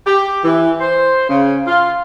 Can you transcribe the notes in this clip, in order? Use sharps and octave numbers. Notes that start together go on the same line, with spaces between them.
G4
E3
C5
C#3
F4